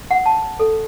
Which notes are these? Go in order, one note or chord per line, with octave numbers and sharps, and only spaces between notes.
F#5
A5
A4